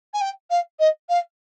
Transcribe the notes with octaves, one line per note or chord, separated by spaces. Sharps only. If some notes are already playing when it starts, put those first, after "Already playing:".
G#5
G5
F5
D#5
F5